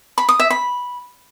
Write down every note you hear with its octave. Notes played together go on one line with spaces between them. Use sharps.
B5
D#6
E5
B5